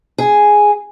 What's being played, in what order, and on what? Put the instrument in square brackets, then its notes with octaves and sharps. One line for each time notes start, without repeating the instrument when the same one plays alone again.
[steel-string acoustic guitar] G#4